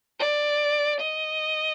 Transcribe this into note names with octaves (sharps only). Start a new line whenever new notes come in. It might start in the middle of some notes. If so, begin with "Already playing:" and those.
D5
D#5